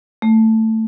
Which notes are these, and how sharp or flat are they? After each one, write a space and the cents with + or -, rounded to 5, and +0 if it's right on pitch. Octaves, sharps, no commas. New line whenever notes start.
A3 +15